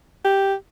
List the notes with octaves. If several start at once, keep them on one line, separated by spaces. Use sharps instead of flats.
G4